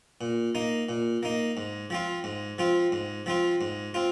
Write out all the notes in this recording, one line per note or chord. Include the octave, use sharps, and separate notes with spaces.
A#2
A#3 D#4
A#2
A#3 D#4
G#2
F3 C4 F4
G#2
F3 C4 F4
G#2
F3 C4 F4
G#2
C4 F4